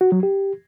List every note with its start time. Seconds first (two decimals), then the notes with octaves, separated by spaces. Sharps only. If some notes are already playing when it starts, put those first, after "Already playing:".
0.01 F#4
0.12 F#3
0.23 G4